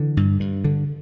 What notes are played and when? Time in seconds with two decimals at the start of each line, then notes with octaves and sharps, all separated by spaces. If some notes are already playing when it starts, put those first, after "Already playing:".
Already playing: D3 E3
0.17 G2
0.40 G2
0.64 D3